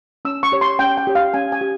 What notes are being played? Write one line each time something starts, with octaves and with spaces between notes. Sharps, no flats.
C#4 E6
C#6
G4 C#5
C6
C#4 G5
G5
G4 C#5
F5
C#4 G#5
G#5
G4